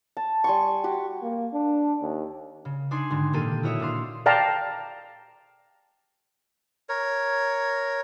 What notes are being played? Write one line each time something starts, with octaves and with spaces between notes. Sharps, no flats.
A5
G3 G#5 C6 C#6
F#4 G4
A#3
D4
D#2
C#3
D4 D#4 D5 G#5 C6
G#1 D3
A#2 D#3 A#3 G4 A4 D#7
E4 F#4 C#5 D#5 E5
A#2 D4 F5 C6
D5 F5 G5 A5 A#5
A#4 C#5